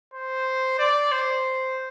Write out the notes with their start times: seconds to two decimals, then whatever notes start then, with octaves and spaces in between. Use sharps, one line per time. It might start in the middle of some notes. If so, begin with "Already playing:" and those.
0.14 C5
0.79 D5
1.12 C5